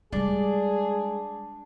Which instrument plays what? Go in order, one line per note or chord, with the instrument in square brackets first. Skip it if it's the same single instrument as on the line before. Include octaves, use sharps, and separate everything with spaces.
[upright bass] G3 G#3 [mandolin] D4 [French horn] G#4